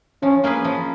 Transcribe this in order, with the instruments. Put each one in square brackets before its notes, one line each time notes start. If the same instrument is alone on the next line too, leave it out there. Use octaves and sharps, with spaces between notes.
[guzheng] F3 [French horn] C#4
[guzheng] A#3 C#4 G#4 B4
F3